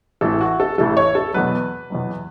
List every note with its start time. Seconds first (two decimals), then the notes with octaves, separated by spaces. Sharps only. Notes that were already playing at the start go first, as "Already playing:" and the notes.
0.21 A1 A2 E3 A4
0.41 F#4
0.60 A4
0.78 A1 A2 E3 A4
0.97 C#5
1.15 A4
1.34 E2 B2 F#3 B4
1.90 E2 B2 F#3